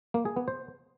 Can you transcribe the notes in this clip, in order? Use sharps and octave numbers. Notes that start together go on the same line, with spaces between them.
A#3
G#4
B3
C5